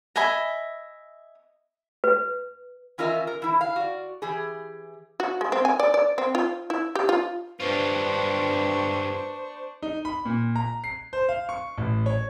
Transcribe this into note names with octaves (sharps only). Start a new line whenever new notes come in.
D#5 E5 G#5 B5
B4
E3 C#4 F4 A#4 D#5 E5
A#4
E3 E4
F5
F#4 D5
E3 G4 G#4
F#4
G#3
C4
G#5
D5
D5
C4
F4
E4
G4
F4
G2 D4 F4 B4 C5 C#6
D#4
B5
A#2
A#5
C7
C5
F5
C#6
A1
C#5